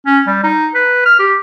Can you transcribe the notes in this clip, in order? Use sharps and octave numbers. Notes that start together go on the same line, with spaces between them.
C#4
G3
D#4
B4
F6
G4